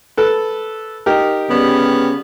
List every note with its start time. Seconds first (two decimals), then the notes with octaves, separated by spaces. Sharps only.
0.17 A4 B4
1.06 D#4 G4 A#4
1.50 C#3 G3 B3